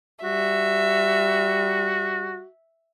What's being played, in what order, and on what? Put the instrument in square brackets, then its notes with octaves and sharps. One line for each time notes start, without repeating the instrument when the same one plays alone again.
[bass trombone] G3 [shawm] F#4 [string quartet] E5